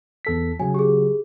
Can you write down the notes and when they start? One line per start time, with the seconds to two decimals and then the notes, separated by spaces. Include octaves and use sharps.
0.25 E2 A4 B6
0.60 C#3 F#3 G#5
0.74 G4 G#4